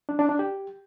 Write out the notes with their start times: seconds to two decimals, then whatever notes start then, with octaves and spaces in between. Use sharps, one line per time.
0.09 D4
0.19 D4
0.29 D4
0.39 G4